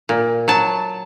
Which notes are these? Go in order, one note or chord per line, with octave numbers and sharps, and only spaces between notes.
A#2
F#3 A5